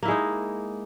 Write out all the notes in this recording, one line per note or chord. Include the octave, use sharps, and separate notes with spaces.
G#3 A#3 D#4 E4